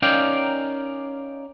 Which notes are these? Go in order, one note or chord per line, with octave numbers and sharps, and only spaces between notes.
C#4 D#4 A#4 D5 F5 G5